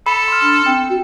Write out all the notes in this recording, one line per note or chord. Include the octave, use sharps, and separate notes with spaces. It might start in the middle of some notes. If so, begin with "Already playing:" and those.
A4 B5
C6 F6
D4
C4 G5
F#4